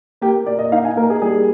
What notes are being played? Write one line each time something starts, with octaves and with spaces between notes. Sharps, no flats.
A#3 G4
A#2 D5
D#5
D#4 F5
G#5
A#3 A#4
G#4
G3 G#4